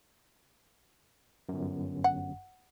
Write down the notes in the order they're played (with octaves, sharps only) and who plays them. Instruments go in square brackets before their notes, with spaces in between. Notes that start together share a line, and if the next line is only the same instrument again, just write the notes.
[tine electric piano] G1 F#2
[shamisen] F#5